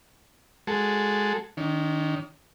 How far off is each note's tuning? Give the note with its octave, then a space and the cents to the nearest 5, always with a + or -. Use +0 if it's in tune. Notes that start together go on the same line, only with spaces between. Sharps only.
G#3 +0 F#4 -5 A4 +0
D#3 +0 D4 -45